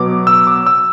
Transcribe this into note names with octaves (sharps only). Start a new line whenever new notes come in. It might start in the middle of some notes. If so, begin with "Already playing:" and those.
Already playing: B2 F#3 B3 D6
E6
D6
E6